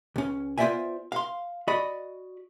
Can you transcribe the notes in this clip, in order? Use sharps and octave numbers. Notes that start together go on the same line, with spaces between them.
C#2 C#4
B3 F4 C5 D5 E5 G#5
F5 C6
F#4 D5 D#5 B5